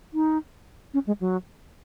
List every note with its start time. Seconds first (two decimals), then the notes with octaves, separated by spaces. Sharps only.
0.14 D#4
0.94 C#4
1.07 G#3
1.21 F#3